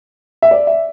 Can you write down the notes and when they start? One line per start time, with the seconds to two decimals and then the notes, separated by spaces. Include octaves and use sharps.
0.42 E5
0.51 D5
0.67 E5